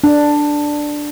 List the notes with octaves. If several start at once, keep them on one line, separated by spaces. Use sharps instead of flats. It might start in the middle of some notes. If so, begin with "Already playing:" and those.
D4